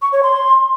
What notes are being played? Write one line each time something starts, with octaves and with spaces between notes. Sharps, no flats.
C#6
C#5
C6